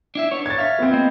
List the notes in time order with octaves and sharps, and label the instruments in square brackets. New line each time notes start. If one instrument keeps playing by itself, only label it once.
[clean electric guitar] D4 E4 E5
B3 D4 C#5
[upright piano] G#6 A6
[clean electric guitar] E5 F5
[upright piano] B3 C4
[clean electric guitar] A#3 D#5